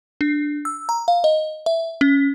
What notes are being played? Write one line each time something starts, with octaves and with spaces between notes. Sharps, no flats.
D4
E6
A#5
F5
D#5
E5
C#4